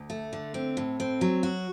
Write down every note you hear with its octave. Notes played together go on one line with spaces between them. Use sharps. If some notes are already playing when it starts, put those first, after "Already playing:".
Already playing: D2
A3
D3
C4
A2
C4
F#3
F#4